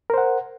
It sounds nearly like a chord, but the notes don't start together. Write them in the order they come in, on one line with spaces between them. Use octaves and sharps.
A#4 C5 F#5